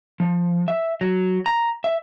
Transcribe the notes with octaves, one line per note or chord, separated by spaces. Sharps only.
F3
E5
F#3
A#5
E5